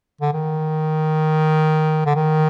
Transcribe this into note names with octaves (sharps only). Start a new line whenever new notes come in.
D3
D#3
D3
D#3